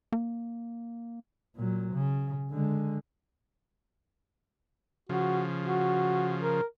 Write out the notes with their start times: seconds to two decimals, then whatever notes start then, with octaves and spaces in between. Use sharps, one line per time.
0.12 A#3
1.56 A#2 F#3
1.94 C#3
2.51 D3 G#3
5.09 C#3 F3 F#4
5.63 F#4
6.42 A#4